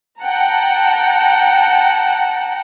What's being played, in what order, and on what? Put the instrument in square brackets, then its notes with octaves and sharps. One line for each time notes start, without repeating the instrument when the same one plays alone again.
[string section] F#5 G5 A5 A#5